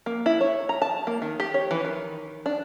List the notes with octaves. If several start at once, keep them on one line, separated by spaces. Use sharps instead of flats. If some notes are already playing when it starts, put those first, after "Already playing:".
A#3
E4
C#5
A#5
A5
A#3
D#3
G4
C#5
E3
D#3
D4